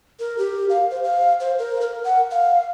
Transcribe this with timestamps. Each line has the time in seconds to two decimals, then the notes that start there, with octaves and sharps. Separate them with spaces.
0.20 A#4
0.38 G4
0.70 F5
0.91 C5
1.03 F5
1.40 C5
1.59 A#4
1.81 A#4
2.04 F#5
2.31 F5